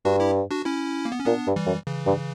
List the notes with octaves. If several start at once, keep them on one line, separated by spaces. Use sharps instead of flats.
G2 D4 F#4
E4 G4
D4 F#4
C#4 E4
A#3
B3
C#4
A#2 B3 D4
G2
E3 G3
F#2
C#3 E3
G2